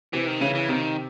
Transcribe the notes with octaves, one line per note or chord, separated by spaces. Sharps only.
C3 E3 C4
D#3
C#3 E3 C#4
E3
C3 D#3 C4